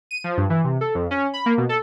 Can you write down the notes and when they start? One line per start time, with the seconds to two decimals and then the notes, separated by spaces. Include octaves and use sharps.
0.11 D#7
0.24 F3
0.37 G2
0.50 E3
0.64 C3
0.81 A4
0.95 F2
1.11 C#4
1.33 B5
1.46 A#3
1.58 B2
1.69 A4